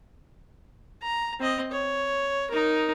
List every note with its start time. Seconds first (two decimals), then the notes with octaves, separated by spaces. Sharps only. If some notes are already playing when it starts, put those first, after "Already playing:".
1.03 A#5
1.40 C4 D#5
1.72 C#5
2.51 D#4 A#4